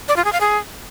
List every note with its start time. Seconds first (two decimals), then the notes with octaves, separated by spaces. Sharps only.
0.08 D5
0.16 F4
0.25 G#4
0.33 F5
0.41 G#4